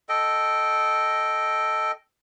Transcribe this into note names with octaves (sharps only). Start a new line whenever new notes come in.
A4 D#5 G5